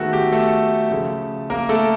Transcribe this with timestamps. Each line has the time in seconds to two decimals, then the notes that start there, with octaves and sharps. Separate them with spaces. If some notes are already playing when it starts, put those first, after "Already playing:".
Already playing: D#3 G#3 A3 B3 F#4 A4
0.13 G4
0.32 A3 A4
0.91 C#3 F3 A3
1.50 A#3 A#4
1.69 A3 A4